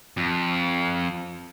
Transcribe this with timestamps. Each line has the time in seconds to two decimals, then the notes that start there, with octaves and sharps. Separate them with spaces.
0.17 F2